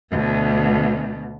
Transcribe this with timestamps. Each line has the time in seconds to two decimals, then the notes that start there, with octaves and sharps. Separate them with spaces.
0.10 D2 B2